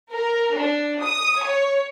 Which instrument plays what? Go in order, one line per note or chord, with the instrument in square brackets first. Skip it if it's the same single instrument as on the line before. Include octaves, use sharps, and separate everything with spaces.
[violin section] A#4
D4
D#6
C#5